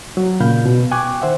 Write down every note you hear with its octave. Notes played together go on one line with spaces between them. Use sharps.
F#3
A#2 C#3 F5 B5 G6
B2
G5 G#5 C#6 D6 F#6 G#6
D#3 C5 E5 F#5